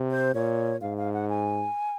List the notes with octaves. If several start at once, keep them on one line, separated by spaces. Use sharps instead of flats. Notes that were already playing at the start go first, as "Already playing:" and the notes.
Already playing: C3
C5
A#2 C#5
G#2 F5
F5
F#5
G#5